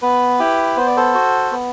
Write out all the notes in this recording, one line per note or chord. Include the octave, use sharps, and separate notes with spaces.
B3 B4
E4 G4
B3 C5
D5
A4 C5
F#4
B3